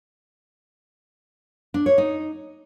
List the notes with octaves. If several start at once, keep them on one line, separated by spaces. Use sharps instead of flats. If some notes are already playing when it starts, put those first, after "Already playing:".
D4
C#5
D#4